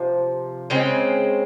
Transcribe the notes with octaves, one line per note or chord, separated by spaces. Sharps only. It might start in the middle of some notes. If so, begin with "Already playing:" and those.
Already playing: C3 F3
C#3 G#3 C4